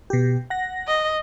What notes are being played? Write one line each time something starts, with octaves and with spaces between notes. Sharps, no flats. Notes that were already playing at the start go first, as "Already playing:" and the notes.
B2 G4
F#5 A#6
D#5